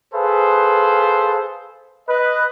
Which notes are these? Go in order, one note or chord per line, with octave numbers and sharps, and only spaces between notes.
G#4 A4 B4 C5 F5
B4 D#5